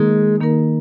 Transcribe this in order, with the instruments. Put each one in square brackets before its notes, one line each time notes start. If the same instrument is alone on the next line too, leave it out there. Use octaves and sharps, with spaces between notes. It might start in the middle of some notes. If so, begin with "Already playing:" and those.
Already playing: [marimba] D#3 A#3 D#4 A#4 [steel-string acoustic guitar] G#3
[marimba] D#3 A#3 D#4 A#4